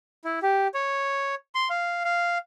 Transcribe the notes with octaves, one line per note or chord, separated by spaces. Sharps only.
E4
G4
C#5
C6
F5
F5